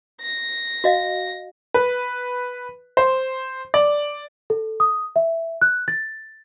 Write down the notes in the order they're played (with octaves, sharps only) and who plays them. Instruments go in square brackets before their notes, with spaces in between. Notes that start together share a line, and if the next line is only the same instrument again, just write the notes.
[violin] A#6
[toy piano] F#4 D#5 F5
[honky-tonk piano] B4
C5
D5
[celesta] A4
D#6
E5
F#6
A6